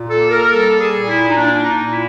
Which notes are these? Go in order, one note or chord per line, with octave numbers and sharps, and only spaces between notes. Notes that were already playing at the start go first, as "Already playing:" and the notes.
Already playing: A#2
A#3 A4
A#4
G3 A4
G#4
A#2
E4
D#4
A#3 D4
D4
D#4
A#2
E4